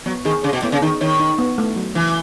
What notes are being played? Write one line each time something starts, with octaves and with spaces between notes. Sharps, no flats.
F#3 B3
D#3 G#4
C#3 G#4
B2
A2 B3
C#3
D#3 D#4
D#3 C#5
D#4
B3
A3
F#3
C#3 E3